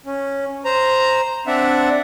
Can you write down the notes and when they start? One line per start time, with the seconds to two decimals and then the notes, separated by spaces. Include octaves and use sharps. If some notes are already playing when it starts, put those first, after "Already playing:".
0.06 C#4
0.65 C5 A#5
1.47 C4 D4 D5 E5 F#5